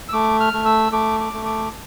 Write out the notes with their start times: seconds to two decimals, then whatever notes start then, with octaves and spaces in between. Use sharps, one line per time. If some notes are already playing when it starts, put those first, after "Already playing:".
0.09 E6
0.13 A3 D6
0.40 F6
0.53 A3
0.66 E6
0.92 A3 D6
1.20 D6
1.33 A3
1.45 D6